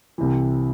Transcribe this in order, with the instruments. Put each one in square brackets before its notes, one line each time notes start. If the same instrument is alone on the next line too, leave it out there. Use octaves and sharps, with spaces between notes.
[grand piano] C2 C3 E3